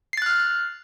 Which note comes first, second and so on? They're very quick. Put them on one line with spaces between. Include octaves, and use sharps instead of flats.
C7 A6 F#6 F6